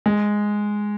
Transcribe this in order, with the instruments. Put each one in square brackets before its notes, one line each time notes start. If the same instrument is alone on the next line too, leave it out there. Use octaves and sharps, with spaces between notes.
[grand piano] G#3